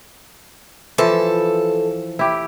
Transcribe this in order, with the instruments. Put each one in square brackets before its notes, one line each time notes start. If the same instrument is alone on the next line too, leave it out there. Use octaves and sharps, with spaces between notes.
[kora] E3 F3 [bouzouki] A4
[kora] E4 G4